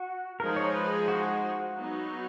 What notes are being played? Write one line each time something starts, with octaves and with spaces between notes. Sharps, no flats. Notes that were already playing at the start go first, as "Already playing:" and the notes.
Already playing: F#4
F3 G#3 D#4 G#4 A#4
C#5
B4
F#4
F#3 B3 D#4